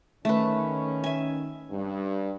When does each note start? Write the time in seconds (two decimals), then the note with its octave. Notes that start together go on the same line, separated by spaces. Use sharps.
0.25 D#3 A3 C#4 B4
1.04 E5 G#5
1.71 G2